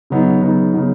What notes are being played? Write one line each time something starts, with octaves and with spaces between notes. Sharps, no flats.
C#3 F#3 B3 D#4
C#3 F#3 B3 D#4
C#3 F#3 B3 D#4